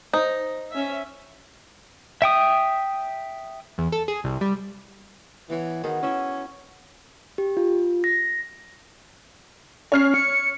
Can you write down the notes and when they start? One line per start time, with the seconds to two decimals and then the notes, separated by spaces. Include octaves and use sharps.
0.13 D#4 C5
0.72 C#4 E5
2.22 E5 G5 D#6
3.78 E2
3.92 A4
4.08 G#4
4.24 C2
4.41 G3
5.50 E3 B3 C#5
5.84 D#3 B3 F#4 G#4
6.03 C#4 E4 E5
7.38 G4
7.57 F4
8.04 A#6
9.92 C#4 C#5 F6 C7
10.14 C#7